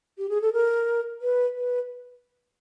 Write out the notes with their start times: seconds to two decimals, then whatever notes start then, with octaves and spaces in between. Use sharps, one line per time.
0.18 G4
0.29 G#4
0.42 A4
0.53 A#4
1.22 B4
1.56 B4